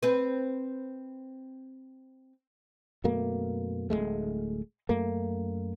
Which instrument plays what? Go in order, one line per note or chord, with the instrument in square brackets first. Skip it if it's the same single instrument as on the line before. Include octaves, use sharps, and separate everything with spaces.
[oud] C4 B4
[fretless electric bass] F#2 B2 A3 A#3
D1 D#2 G#3 A3
F#2 A3 A#3